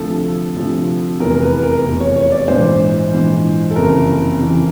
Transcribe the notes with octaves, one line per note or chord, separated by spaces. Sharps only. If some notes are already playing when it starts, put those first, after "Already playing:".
Already playing: D2 C3 F3 A4
D2 C3 F3
F1 E2 C3 A#4
A#4
B4
A#4
F1 E2 C3
C#5
C#5
D5
A#1 G#2 E3 C5
A#1 G#2 E3
A4
F#1 F2 C3 E3 A#4
F#1 F2 C3 E3